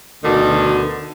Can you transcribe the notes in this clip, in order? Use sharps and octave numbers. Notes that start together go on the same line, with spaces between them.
D2 B2 D3 D#3